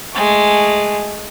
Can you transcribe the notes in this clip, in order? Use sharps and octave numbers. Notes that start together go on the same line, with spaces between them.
G#3 A3